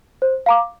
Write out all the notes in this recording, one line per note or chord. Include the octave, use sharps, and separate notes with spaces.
C5
F5 A#5 D6